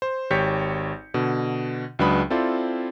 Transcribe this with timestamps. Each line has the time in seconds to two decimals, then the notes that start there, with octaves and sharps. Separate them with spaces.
0.02 C5
0.30 G#1 G4 C#5 G6 B6 C#7
1.14 B2 D3
1.99 C#2 F#3 D4 B4 B5 D#6
2.30 C4 E4 F4 A4 C5 D5